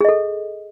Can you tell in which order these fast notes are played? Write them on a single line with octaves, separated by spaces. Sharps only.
G#4 D#5 A4